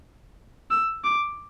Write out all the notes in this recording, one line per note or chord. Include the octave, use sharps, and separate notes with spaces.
E6
D6